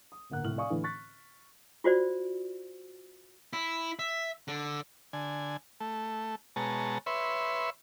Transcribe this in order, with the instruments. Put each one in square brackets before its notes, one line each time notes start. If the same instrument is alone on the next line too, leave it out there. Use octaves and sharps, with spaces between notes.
[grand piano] D#6
D1 G1 A#3 F#5 F#6
F1 A2 F6 F#7
D5 F5 G#5 C#6 D#6
A2 D3 E3 A3
C#6 F#6 A6 B6
[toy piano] F4 F#4 C5 D5
[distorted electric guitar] E4
E5
D3
[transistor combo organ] D3 G#5
A3
B2 G#3 C#5 A5 A#5
B4 C#5 E5 C6